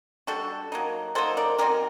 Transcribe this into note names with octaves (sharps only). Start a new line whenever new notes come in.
G3 D4 F#4 A4
F#3 A#3 D#4
F#3 A#3 D#4 A4 C5
A#4 D5
F#3 C4 D#4 G4 A#4